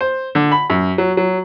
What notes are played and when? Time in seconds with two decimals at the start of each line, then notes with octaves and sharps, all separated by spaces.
0.01 C5
0.35 D3
0.52 B5
0.70 F#2
0.98 F#3
1.17 F#3